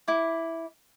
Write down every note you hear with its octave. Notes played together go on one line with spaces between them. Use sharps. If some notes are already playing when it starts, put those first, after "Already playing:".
E4 D6